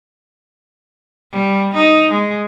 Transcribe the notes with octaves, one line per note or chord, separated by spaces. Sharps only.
G3
D#4
G#3